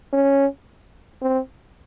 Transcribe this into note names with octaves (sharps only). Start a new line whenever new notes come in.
C#4
C4